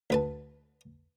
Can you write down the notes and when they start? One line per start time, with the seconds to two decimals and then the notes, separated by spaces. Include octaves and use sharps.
0.10 D2 B4 A5